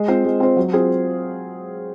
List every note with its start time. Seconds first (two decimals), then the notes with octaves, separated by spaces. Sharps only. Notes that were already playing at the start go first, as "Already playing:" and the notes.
Already playing: G#3
0.08 C4 F4 C5
0.25 G#3
0.40 C4 F4 C5
0.57 F#3
0.73 C4 F4 G#4 C5